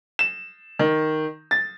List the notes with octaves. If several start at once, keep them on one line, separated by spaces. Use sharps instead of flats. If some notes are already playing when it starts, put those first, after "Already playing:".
E7
D#3
A6